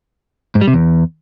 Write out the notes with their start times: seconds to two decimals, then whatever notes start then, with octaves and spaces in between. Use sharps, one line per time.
0.55 G#2
0.61 G3
0.67 C3
0.73 E2